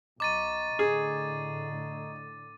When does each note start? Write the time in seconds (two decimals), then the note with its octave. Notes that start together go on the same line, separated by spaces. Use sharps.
0.20 B1 D#5 A#5 C#6 D6 A6 D#7
0.79 A2 D3 G#4